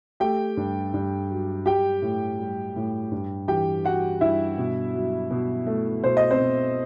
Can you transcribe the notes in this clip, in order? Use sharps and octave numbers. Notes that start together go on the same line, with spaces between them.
A3 G4 G5
G2
G2
F#3
G3 G4 G5
A2
G3
A2
G2
E3 G4 G5
G3 F#4 F#5
G2 E4 E5
B2
F#3
B2
A3
B2 C5
D#5
C4 C5
B2